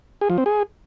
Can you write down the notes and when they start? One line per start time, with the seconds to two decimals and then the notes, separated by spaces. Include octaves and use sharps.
0.21 G#4
0.30 F3
0.38 C4
0.46 G#4